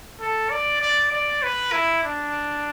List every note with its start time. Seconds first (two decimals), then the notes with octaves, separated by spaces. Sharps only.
0.21 A4
0.51 D5
0.82 D5
1.12 D5
1.43 B4
1.72 E4
2.04 D4